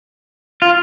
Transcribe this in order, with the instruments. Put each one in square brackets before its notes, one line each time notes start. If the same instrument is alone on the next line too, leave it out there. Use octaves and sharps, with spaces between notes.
[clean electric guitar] F4